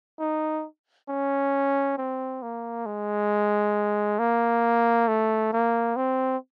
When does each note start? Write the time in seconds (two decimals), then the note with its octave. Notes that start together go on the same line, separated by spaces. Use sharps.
0.20 D#4
1.09 C#4
1.98 C4
2.42 A#3
2.86 G#3
4.19 A#3
5.08 A3
5.53 A#3
5.96 C4